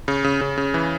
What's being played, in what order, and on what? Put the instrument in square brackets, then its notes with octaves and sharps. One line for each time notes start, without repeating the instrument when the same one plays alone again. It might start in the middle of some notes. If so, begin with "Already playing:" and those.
[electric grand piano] C#3
C#3
C#3
C#3
E3